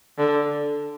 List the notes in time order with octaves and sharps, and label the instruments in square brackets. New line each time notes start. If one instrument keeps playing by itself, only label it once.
[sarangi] D3